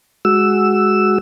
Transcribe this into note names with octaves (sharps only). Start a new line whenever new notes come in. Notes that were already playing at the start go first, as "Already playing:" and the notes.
G#3 F#4 E6